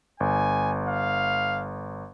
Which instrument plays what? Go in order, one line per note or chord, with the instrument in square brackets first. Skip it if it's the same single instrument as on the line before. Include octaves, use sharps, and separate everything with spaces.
[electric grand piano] G1 [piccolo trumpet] G#5
[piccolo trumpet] F5